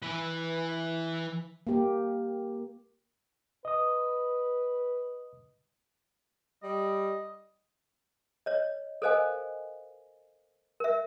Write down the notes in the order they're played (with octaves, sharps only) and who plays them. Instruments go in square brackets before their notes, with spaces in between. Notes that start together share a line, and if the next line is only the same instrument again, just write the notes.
[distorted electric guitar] E3 B4
[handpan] A#3 G4
[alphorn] B4 [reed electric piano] D#5 D#6
[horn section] G3 [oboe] D#5
[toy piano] C#5 D#5
A4 A#4 C5 D#5 F5 G#5
A#4 E5